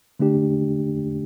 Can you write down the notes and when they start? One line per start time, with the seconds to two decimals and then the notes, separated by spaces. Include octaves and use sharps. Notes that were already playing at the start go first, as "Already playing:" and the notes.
0.19 D3 A3 D4 G4